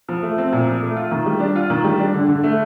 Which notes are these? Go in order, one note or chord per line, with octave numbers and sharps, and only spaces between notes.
F3
A3
C4
A#2
F3
A3
F4
D#3
G3
D4
F4
D#3
G3
D4
D3
D3
A3